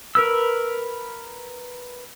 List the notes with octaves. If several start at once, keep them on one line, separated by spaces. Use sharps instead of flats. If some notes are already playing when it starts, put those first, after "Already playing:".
A#4 B4 E6